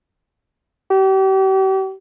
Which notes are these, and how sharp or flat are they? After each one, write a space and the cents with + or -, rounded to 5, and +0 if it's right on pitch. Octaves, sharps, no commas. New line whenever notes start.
G4 -40